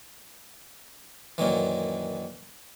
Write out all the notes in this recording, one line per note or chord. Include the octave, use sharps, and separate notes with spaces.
F#2 A#2 D#3 E3